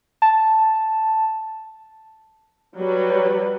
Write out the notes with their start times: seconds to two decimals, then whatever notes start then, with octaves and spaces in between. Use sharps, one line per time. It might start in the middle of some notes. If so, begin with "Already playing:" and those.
0.22 A5
2.77 F#3 G3 B4